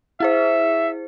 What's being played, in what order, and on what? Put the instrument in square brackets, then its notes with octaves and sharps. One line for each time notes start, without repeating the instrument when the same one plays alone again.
[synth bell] E4 G#4 C5 [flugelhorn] E5